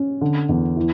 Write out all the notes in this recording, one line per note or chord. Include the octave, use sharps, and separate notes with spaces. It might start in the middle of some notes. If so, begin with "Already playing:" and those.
Already playing: C#4
D3
E2
E3